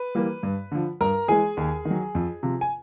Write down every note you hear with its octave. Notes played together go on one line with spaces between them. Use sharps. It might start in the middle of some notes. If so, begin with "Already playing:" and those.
Already playing: B4
E3 G3 A#3
G2
D3 F3
G2 A#4 A#5
E3 G#3 G#4 G#5
D#2
D#3
F#3
F2
C3 F3
G#5